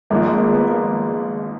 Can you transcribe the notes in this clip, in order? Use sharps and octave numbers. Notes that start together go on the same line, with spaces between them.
G#1 G#2 F3 A#3
G#3
A#3
B3
A#3